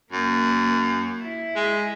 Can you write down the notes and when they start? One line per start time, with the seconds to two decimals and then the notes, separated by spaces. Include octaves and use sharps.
0.12 F#2 A#3
1.21 E4
1.56 G#3